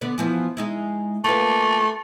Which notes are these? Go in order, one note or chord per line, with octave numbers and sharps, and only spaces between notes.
D3 B3 D5
E3 F3 B3
G#3 D#4 E4
A3 A#3 F4 B4